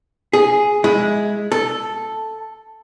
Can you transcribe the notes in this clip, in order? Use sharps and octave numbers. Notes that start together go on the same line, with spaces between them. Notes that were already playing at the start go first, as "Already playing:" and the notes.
G#4
G#3 E4
A4